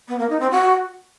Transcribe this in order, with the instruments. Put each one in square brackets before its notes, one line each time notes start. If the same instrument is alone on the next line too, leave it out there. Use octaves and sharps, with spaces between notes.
[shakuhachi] B3
A#3
D#4
C4
F#4